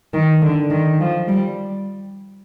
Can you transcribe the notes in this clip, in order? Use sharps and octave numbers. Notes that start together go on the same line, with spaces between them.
D#3
D3
D#3
F3
G3